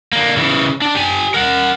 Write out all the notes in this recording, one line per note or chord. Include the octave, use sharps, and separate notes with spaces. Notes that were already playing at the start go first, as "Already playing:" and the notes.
D3 A#3
C#3 E3
D4
G4 G#5
A#4 F#5